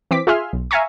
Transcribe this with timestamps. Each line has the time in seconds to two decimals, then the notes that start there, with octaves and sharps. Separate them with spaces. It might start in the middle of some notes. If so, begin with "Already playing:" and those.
0.11 E3 C4 D6 B6
0.27 F4 G#4 E5 G#5 C6 F6
0.53 B1
0.71 E5 F5 G#5 A#5 C#6